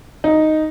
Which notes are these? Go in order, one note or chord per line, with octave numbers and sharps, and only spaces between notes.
D#4